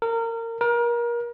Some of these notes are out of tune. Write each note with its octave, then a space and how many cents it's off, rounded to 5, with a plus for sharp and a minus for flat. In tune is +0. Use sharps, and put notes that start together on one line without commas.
A#4 -25
A#4 +30